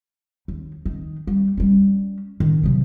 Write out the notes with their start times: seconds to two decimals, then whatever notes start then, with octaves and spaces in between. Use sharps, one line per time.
0.48 D#2
0.86 D#3
1.27 G3
1.57 G3 C#4
2.40 D#3
2.63 C3 F#3